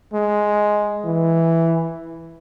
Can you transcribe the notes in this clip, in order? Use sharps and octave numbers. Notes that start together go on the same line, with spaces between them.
G#3
E3